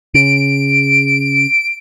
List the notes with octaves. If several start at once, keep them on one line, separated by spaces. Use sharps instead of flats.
C#3 D7